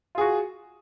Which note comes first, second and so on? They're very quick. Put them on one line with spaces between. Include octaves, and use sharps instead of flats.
F4 G#4 F#4